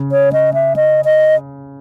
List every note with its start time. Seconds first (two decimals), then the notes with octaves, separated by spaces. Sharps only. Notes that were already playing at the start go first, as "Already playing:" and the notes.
Already playing: C#3
0.12 C#5
0.33 D#5
0.54 E5
0.76 D#5
1.05 D#5